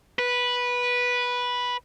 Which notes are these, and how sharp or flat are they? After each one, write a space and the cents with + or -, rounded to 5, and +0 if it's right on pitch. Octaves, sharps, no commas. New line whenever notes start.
B4 -10